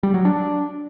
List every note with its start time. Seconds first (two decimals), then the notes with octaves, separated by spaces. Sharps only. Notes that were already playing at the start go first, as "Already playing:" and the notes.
0.03 G3
0.14 F#3
0.25 D4